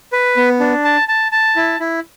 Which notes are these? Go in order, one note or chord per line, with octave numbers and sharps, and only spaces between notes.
B4
B3
D4
A5
A5
A5
E4
E4